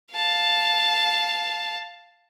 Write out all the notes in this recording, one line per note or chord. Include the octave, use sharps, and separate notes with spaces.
F5 A5